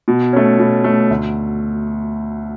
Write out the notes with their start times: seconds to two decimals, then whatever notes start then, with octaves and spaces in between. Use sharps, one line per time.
0.08 B2
0.33 A3 C#4
0.59 B2
0.84 A3 C#4
1.11 D2